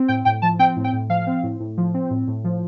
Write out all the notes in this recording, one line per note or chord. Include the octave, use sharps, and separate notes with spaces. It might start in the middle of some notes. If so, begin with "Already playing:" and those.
Already playing: C4
A2 G5
A2 G5
F3 A5
C4 G5
A2
G5
A2
F3 F5
C4
A2
A2
F3
C4
A2
A2
F3